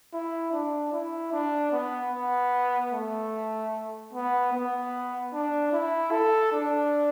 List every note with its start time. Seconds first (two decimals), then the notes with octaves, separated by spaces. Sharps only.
0.13 E4
0.52 D4
0.92 E4
1.32 D4
1.72 B3
2.13 B3
2.92 A3
4.13 B3
4.53 B3
5.33 D4
5.72 E4
6.12 A4
6.52 D4